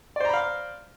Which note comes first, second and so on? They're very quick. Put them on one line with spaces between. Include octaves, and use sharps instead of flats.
D5 C5 A#5 B5 F5